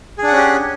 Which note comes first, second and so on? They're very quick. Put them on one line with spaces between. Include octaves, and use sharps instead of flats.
G#4 D4 F#5 C#4 G4